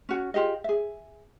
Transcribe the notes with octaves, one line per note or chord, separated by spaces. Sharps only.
C#4 F#4
F4 G4 G#4 D#5
G#4 E5